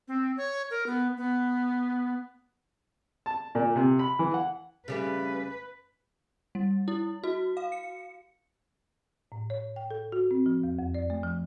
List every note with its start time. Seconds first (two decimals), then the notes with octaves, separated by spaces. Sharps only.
0.08 C4
0.37 C#5
0.70 A#4
0.86 B3
1.17 B3
3.26 A5
3.55 A#2
3.76 C3
3.99 B5
4.19 E3
4.34 F#5
4.88 C#3 G3 A3 B4
6.55 G3
6.88 E4
7.24 F#4
7.57 F5
7.72 C#7
9.32 A2
9.50 C#5
9.76 G5
9.91 A4
10.12 F#4
10.31 C4
10.46 F3
10.63 E2
10.79 F2
10.95 D5
11.10 A3
11.23 F3